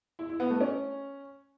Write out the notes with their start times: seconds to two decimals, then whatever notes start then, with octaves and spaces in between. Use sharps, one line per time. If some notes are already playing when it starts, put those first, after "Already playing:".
0.19 E4
0.29 E4
0.40 B3
0.50 A3
0.61 C#4